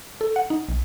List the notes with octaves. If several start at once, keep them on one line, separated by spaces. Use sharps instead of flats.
A4
F#5
D#4
B1